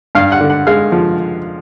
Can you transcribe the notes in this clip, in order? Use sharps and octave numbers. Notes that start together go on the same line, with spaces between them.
G2 F5
F#5
D3
F#5
G#3 F5
F3